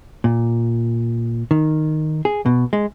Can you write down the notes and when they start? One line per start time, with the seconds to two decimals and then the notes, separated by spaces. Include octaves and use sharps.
0.24 A#2
1.51 D#3
2.25 G#4
2.46 B2
2.73 G#3